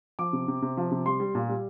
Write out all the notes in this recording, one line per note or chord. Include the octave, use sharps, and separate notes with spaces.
F3 D6
C3
C3
C3
F3
C3
G3 C6
G3
A#2
G3